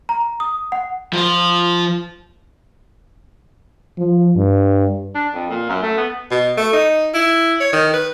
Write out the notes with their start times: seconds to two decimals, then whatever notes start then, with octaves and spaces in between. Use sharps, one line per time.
0.09 A#5
0.40 D#6
0.72 F#5
1.13 F3 C5
3.98 F3
4.36 G2
5.15 D4
5.34 F2
5.50 A#2
5.69 F#2
5.83 A3
5.97 B3
6.31 B2
6.57 A3
6.73 D#4
7.14 E4
7.60 C#5
7.73 D#3
7.94 B4